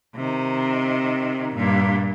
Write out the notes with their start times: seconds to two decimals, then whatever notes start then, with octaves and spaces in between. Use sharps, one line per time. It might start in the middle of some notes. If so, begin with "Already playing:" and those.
0.15 C3 D#3
1.55 G2 A#2